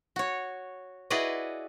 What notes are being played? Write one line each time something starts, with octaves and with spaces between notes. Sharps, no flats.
F#4 C#5
E4 F#4 G#4 B4 D5 D#5